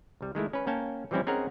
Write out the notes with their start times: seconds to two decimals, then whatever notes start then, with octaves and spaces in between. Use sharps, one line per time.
0.21 C2 G3
0.35 D#3 G#3 A3 E4
0.53 C#4 B4
0.67 A#3 C#4 G5 A5
1.11 E3 F3 G3 C4 C#4 E4
1.27 C4 C#4 D#4 G#4 A#4 F#5